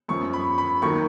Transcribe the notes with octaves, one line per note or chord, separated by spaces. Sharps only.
F#2 F3 C#6
B5
B5
D#2 D#3 F#3 C#6